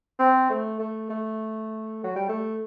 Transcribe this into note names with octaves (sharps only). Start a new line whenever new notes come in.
C4
A3
A3
A3
F#3
G3
A3